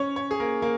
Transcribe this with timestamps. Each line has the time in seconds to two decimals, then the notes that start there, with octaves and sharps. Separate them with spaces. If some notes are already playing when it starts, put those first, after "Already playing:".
Already playing: C#4 C#5
0.16 C#4 C#5
0.31 G#4
0.40 A#3 A#4
0.62 A#3 A#4